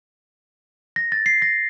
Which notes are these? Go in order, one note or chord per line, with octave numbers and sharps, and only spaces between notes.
A#6
A6
C7
A#6